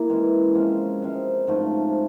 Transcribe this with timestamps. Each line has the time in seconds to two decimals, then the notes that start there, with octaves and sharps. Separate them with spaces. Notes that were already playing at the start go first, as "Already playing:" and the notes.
Already playing: A#3 E4
0.09 E3 G#3 C#4
0.55 C3 F3 G#3 C#4
1.02 C3 F3 G#3 C#4
1.47 G#2 F3 A3